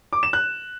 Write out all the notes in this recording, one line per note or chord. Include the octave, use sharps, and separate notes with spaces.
D6
E7
F#6